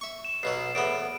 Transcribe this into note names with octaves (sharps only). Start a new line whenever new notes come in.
E5 C#6
E7
B1 B2 F#3 C7
E2 A2 B3 D7